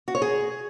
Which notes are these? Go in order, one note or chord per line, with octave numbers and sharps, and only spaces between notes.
F#4
C#5
G#4